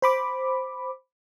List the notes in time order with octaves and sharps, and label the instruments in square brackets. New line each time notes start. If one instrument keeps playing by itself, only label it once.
[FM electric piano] C5 B5 D6